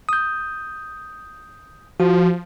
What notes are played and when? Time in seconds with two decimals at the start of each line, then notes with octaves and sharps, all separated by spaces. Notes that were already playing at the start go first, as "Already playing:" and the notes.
0.09 D#6 G6
2.00 F3 F#4